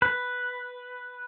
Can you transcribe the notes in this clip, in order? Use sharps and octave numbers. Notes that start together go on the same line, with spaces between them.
B4